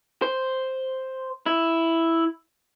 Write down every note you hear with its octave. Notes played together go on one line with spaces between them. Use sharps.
C5
E4